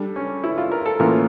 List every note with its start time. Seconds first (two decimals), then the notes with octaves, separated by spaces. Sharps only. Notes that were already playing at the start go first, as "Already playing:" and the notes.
Already playing: G3 D4 A4
0.16 C#4
0.44 E4
0.58 F4
0.72 A#4
0.86 A4
0.99 A2 E3 A#3 C#4 F4 A#4